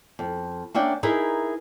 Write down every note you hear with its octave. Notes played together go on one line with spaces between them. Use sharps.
F2
A#3 C#4 D4 E5 F#5 G5
D#4 E4 G#4 A#4 B4 E5